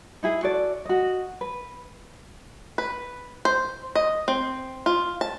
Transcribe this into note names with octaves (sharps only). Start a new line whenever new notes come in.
D#4 E4 G#4
F#4 A4 D5
F#4 D#5
B4
B4
C5
D#5
C4
F4
A5